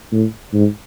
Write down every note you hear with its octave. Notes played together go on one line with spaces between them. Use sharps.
A2
G#2